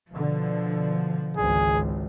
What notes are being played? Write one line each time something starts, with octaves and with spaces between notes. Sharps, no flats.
B2 D3 F3
G#1 C#2 G#4